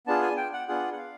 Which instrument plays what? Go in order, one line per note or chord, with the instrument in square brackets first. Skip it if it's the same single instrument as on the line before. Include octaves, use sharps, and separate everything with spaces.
[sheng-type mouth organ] B3 D4 F4 G#4 A5
G#5
G5
F#5
B3 D4 F4 G#4 F#5
F#5
F5